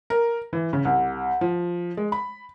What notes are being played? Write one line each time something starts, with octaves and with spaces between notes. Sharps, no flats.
A#4
E3
C#3
C2
F3
G#3
B5